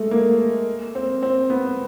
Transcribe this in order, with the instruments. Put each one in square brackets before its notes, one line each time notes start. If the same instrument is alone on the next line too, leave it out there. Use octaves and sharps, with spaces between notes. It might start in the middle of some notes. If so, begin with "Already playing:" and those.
Already playing: [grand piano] G#3 A3
A#3
C4
C4
B3